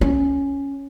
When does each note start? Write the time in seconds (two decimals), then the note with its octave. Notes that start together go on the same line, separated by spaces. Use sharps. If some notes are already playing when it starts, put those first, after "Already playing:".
0.01 C#4